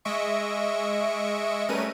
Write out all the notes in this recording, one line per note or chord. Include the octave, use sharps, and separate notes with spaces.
G#3 D#5 E5 C#6 D7
G3 A3 C#4 A#4 B4 D#7